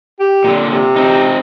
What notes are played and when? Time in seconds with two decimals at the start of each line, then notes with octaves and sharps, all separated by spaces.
0.20 G4
0.44 A#2 D3
0.68 C3
0.96 C4 D#4